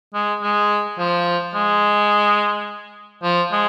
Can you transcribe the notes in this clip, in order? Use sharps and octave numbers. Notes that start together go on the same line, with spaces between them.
G#3
G#3
F3
G#3
F3
G#3